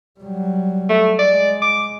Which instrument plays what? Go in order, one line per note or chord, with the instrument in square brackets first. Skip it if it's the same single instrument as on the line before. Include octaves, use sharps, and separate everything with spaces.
[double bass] F#3 G3
[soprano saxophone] A3
[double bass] G#3 [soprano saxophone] D5
[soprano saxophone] D6